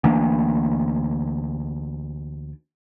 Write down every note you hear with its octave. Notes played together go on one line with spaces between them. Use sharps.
D2 E3 A#3 D4